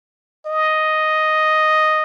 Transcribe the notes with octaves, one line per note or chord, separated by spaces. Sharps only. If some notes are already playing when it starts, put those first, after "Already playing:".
D#5